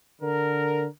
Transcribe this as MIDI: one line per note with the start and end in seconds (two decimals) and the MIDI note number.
0.22 0.86 50
0.22 0.86 70